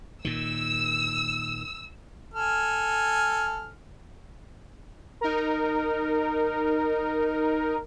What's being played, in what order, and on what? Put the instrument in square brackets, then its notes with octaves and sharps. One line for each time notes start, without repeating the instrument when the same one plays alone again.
[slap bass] A#2 D#3 [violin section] E6
[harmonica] A4 G#5 F6
[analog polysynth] D#4 A#4